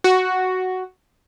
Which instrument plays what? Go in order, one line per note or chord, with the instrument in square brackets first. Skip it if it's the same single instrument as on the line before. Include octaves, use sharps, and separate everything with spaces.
[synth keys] F#4